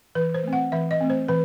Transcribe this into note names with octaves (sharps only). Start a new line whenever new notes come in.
E3 B4
C5
A3 C4
F#5
E3 E5
D#5
A3 C4
C5
E3 B4